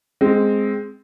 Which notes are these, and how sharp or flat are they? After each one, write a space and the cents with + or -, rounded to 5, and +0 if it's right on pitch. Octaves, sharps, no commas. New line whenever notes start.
G#3 +0 C4 +0